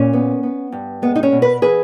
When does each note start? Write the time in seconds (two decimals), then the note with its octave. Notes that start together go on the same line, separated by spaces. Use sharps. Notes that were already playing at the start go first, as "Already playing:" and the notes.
Already playing: A#2 C#4
0.13 B3
0.43 B3
0.72 G2
1.02 G#3 B3
1.15 D#4
1.23 C#4
1.32 B2
1.42 B4
1.62 E3 G#4 B4